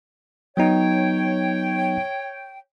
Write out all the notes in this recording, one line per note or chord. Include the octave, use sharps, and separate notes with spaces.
F#3 B3 D#4 C#5 G5